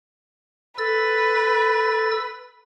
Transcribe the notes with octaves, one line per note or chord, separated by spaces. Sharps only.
A4 B4 E6 A6